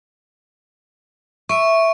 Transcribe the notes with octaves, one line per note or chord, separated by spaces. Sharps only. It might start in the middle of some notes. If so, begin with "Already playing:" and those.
E5 C#6 D7